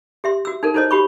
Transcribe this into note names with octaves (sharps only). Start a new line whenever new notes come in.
G4 E5 C6
F#4 E6
D#4 A4 A#4
D#4 E4 A4 C5 C#5 D#5
F#4 G4 B5 C#6